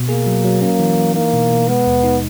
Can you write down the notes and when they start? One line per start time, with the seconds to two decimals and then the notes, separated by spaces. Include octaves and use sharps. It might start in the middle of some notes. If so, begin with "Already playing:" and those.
Already playing: B2
0.08 A#3 G#4
0.26 F#3
0.44 F#3
0.61 A#3 C#4
0.79 E3
0.97 E3
1.15 A#3 D#4
1.33 B2
1.51 B2
1.68 G#3 B3
1.86 D#2
2.04 D#4